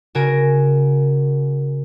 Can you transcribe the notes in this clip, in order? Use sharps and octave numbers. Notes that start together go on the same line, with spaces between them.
C#3 F#4 A#4 G#5 A#6 D7